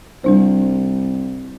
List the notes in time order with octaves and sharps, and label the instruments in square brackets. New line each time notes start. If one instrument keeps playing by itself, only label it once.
[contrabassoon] C2 [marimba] G3 D4 C5